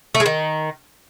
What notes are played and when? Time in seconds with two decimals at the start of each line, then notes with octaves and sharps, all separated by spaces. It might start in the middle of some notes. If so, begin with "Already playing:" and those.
0.15 A3
0.20 G#3
0.26 D#3